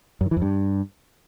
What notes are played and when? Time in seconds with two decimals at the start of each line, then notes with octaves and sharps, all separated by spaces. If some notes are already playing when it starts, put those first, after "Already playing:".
0.21 F#2
0.26 D#3
0.31 E3
0.37 F2
0.42 G2